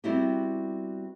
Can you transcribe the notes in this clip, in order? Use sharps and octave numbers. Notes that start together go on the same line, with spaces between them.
G3 B3 C4 E4 F#4 G4